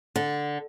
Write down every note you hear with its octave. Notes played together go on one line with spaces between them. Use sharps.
D3